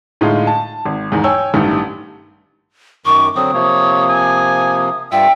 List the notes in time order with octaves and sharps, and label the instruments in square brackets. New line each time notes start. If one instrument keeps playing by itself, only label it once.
[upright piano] A2 D3 G#3 D#4 F4
A5
G#1
E2 G#2 D#3
C#5 G5 G#5 E6
A1 G2 D#3 A3
[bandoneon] F#2 D#3 D6 [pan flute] C#6
[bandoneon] D3 F#3 C4 [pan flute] D#6
[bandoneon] C3 F3 A#3 [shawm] C#5
[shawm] G#5
[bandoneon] G2 G3 F4 [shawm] E5 [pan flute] G5